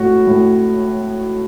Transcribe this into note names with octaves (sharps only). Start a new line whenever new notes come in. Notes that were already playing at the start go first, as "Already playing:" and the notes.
Already playing: A2 F#4 C#5
A2